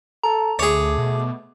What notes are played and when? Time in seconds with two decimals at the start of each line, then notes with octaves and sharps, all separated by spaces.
0.23 A4 A#5
0.59 D2 A3 G#4 C#5 D6
0.98 B2